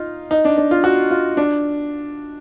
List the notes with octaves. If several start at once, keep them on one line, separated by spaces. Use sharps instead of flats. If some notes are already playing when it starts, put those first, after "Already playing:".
Already playing: D#4 F4
D#4
D4
D4
F4
F#4
F4
D4